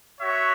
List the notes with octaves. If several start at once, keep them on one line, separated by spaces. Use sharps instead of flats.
F#4 C#5 E5